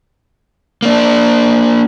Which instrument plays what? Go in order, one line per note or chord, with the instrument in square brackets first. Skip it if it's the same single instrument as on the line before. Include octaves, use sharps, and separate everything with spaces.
[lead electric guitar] A#3 D4